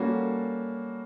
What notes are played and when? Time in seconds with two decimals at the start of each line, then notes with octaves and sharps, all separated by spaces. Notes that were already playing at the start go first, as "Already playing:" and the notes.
Already playing: G3 A#3 C#4 F#4 A4